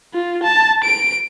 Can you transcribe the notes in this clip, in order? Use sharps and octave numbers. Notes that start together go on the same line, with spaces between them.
F4
A5
D7